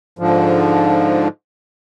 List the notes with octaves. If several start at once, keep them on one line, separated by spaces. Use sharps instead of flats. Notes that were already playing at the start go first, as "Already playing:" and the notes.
G#2 D3 F3